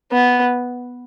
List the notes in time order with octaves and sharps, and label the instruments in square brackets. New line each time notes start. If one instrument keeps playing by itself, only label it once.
[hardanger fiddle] B3